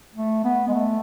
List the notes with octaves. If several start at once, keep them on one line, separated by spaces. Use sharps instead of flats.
A3
B3
G#3
A3